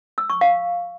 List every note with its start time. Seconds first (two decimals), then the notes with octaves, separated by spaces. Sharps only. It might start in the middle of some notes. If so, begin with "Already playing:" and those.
0.18 E6
0.30 C#6
0.41 F5